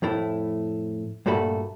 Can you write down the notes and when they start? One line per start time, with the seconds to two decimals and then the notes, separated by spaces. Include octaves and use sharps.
0.02 F2 A2 A3 E4
1.26 G2 A#2 A3 F#4 A4 B5